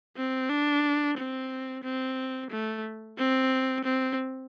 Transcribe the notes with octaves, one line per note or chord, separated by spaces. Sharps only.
C4
D4
C4
C4
A3
C4
C4